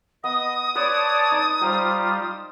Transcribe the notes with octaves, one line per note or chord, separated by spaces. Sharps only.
B3 D#5 D#6
B4 C#5 D5 A5 C6
D#4
G3 F4 C5 G5 A#5